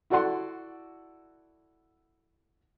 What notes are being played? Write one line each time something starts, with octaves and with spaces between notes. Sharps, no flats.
E4 F#4 A4 D5 F#5 C6